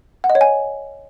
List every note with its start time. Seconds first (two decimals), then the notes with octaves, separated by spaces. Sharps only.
0.24 F#5
0.30 D#5
0.35 C#5
0.41 G#5